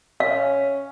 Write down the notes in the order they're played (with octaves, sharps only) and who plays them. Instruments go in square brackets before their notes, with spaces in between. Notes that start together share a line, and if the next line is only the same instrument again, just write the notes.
[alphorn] C#4 [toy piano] F5